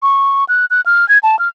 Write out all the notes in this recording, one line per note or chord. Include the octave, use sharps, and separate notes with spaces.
C#6
F#6
F#6
F6
G#6
A5
F6